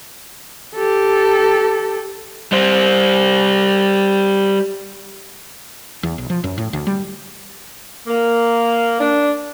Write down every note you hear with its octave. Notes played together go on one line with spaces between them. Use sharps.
G4 A4
G3 C5
E2
B1
F3
F#2
A2
D2
G3
A#3
D4